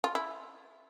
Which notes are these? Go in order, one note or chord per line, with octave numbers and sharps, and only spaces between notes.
F4
E4